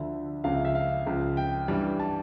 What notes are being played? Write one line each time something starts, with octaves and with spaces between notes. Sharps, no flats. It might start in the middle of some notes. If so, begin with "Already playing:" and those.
Already playing: D2 D3 F3 E5
C#2 C#3 F3 F5
E5
E5
F5
C#2 C#3 F3
G5
G2 E3 G3
A5